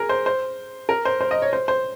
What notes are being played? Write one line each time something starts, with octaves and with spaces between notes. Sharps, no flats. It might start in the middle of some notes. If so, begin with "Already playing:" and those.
Already playing: G#4 A#4
C5
C5
A#4
C5
C5
D#5
C#5
C5
C5